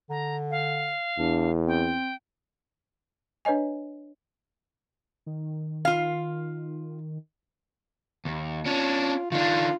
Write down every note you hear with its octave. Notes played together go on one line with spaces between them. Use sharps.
D3 A#5
F5
E2 D4
C4 G5
D4 B4 C#5 D#5 G#5
D#3
F4 F5
D#2
C#4 D4 F4
D#3 D4 F4